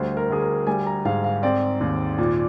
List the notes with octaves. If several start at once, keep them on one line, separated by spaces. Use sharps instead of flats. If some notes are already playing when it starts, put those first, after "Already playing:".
Already playing: D2 G3 C5
A#4
D2 G#4
A#4
G3 G#5
A#5
G#2 F5
F5
C4 D5
D#2
A#2